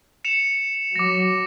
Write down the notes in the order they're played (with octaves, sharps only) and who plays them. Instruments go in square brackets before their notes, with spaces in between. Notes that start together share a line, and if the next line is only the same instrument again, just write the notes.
[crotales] C#7 E7 F7
[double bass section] F#3 [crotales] D6 A#6